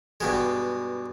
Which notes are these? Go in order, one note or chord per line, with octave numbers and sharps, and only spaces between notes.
G2 B2 G#3